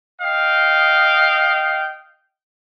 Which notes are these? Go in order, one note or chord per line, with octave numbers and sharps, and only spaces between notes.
D#5 F5 G5